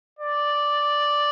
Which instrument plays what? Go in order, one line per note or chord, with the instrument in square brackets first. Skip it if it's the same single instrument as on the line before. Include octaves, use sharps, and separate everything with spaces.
[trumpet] D5